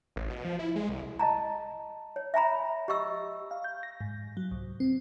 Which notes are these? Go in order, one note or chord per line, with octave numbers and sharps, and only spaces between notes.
A1
B2
F3
E4
G#3
C2
D#5 A5 A#5
C#5
E5 G#5 A#5 B5
G4 D#5 C#6 E6
F5
G6
A#6
G#2
F#3
C2
C4